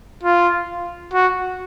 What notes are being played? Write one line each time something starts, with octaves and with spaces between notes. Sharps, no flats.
F4
F#4